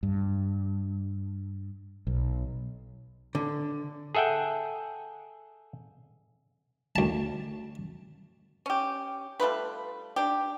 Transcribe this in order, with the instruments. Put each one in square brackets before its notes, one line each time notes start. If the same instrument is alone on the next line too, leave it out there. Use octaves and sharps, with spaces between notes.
[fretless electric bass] G2
B1
[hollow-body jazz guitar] D3
[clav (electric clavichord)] G#4 A4 E5 F#5 G5
[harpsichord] D2 A5
[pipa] C#4 G4
G3 A3 F4 B4
D4 G4